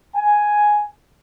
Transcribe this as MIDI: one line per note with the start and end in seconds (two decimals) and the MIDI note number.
0.15 0.86 80